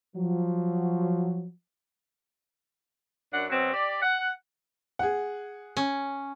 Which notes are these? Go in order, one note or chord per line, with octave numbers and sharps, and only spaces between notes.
F3 F#3
F#2 D4 F#5
B2 F#3 C4
G4 D5
F#5
G#4 F#5
C#4